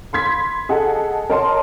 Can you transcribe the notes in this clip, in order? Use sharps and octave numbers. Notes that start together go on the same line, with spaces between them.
B5 C6 G#6 B6
G#4 A4 D#5 F#5 A5
A#4 C#5 D#5 A5 A#5 C6